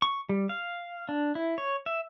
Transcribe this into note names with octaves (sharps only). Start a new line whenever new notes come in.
C#6
G3
F5
D4
E4
C#5
E5